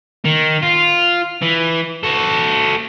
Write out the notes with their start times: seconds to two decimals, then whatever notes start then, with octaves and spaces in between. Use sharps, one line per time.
0.25 D#3
0.63 F4
1.42 E3
2.03 F#4 A4